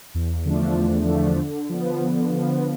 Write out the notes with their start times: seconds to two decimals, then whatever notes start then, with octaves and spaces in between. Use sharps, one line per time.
0.15 E2
0.45 D3 F3 A3 D4
0.76 E2
1.08 D3 F3 A3 D4
1.39 D3
1.70 F3 B3
2.01 D3
2.32 F3 B3